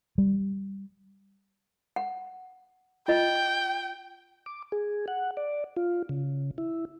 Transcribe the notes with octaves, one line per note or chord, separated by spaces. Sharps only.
G3
F#5
F4 D#5 G5
D6
G#4
F#5
D5
F4
C#3
E4